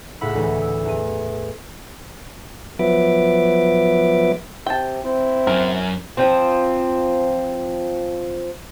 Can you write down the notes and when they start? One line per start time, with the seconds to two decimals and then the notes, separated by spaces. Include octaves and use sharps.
0.21 C#2 A2 F#5 B5 E6
0.35 D2 E3
0.62 E6
0.85 E2 D#7
2.79 F3 F#3 B3 B4 E5 D6
4.66 C3 G5 A5
5.04 C4 E4
5.47 F#2 F#3 A#4
6.17 F3 C4